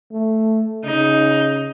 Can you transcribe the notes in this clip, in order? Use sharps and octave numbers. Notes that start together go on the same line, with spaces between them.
A3
C#3 D#4